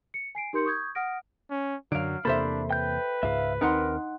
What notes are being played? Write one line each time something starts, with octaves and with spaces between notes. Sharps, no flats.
C#7
G#5 C7 D7
D#4 G4 A#4 C6 G6 C#7
C#6 D#6 G6 G#6
F#5 D#6 F6 A#6 D7
C#4
F#2 D3 F#3 F5 D7
E2 C3 A#3 D4 A4 C5 E5 B5
B4 G5 G6
C#2 G#2 E5 F5
D#2 C4 D#4 A#4 F#5 C6